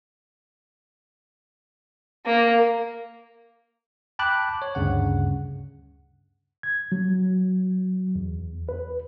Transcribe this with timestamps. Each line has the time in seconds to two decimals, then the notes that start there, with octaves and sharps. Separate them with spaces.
2.26 A#3
4.19 G5 A5 B5 D6 F#6
4.62 C#5
4.75 D2 G2 C#3 F#5
6.63 G#6
6.92 F#3
8.16 E2
8.69 B4